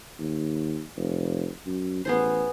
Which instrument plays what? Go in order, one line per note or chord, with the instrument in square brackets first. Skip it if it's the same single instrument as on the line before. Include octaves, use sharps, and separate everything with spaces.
[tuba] D#2
F1
F#2
[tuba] A1 [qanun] B3 G#4 C5